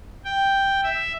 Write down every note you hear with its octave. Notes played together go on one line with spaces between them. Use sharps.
G5
E5